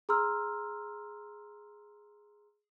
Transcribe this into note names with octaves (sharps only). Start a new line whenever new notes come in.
G#4 A#5 C6 E6 F6